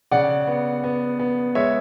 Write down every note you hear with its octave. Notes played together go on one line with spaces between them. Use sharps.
C#3 D5 F#5
B3
B3
B3
G#3 C#5 E5